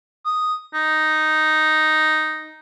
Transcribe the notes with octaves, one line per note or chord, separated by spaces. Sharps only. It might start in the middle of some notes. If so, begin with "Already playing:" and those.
D#6
D#4